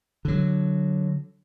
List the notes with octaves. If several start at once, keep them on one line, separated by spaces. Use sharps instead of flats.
D3 F#3